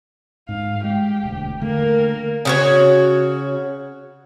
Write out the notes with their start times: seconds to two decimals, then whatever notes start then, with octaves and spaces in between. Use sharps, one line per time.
0.49 G#2 F5
0.84 G#3 G4
1.23 E1 D2
1.61 D3 A3 A#3 A#4
2.45 C#3 F#4 C#5